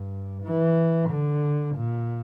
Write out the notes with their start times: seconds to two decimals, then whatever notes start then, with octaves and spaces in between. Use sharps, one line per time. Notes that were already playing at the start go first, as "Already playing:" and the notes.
Already playing: G2
0.44 E3
1.10 D3
1.76 A#2